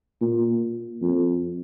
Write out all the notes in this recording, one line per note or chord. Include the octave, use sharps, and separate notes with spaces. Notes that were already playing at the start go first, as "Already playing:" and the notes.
A#2
F2